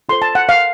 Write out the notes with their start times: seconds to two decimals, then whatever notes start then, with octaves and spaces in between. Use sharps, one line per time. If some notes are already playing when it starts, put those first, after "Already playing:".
0.09 F4 A4 C5 C6
0.22 A5
0.35 F#5
0.49 F5